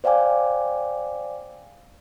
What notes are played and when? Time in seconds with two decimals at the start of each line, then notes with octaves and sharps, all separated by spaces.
0.04 C5 D5 F5 G5 G#5 D6